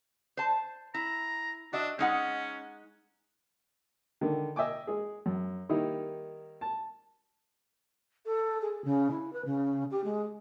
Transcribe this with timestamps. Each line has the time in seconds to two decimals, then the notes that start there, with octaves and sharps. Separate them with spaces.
0.37 C5 A5
0.94 E4 A#5
1.73 D4 F#4 D#5 E5
1.99 G#3 C#4 D#4 F#5
4.21 D3 D#3
4.56 D#5 E5 G5 G#5 D6
4.87 G#3 G#4
5.26 F#2
5.69 D#3 G3 A#3 D#4 E4
6.61 A5
8.25 A4
8.61 G#4
8.84 C#3
9.11 E4
9.33 B4
9.45 C#3
9.91 G4
10.04 G#3